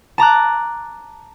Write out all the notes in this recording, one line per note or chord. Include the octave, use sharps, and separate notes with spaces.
A5 A#5 D6 F#6